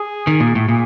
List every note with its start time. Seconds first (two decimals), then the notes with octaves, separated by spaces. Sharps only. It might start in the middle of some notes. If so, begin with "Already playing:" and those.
Already playing: G#4
0.27 D#3
0.40 A#2
0.55 A2
0.68 A#2 G#4